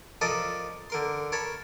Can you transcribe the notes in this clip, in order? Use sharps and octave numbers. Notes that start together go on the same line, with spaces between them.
F3 A4 A#4 D5 D#5
D3 A#4 C6
A#4 C#5 A5 B5